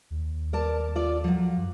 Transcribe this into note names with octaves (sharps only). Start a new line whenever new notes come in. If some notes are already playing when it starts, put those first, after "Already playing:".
D#2
A#4 D5 A5
F4 A4 D5
F3 F#3
F#2